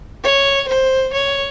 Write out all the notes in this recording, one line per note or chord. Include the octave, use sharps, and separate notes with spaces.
C#5
C5
C#5